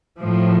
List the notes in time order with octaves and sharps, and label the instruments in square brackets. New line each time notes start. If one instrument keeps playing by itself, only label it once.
[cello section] A2 F3